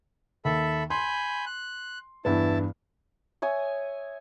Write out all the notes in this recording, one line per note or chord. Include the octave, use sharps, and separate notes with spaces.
D#2 A4 E5 B5
G#5 B5 C6 G6
F#6
E2 G2 B3 E4 A5
C#5 E5 G#5 D#6